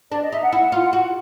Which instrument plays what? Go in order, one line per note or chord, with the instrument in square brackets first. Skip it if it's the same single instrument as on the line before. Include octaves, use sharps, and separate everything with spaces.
[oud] D4 [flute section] D5
[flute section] D#5
[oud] D#4 [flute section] E5
[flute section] F#5
[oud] E4
F4
F#4